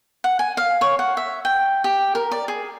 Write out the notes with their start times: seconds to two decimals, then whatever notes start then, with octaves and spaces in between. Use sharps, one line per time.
0.24 F#5
0.39 G#5
0.57 F5
0.81 C#5
0.99 F#5
1.17 E5
1.45 G5
1.84 G4
2.15 A#4
2.32 D5
2.48 G#4